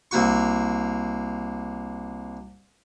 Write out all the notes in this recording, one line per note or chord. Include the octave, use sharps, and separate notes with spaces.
C2 A#3 F#4 C#6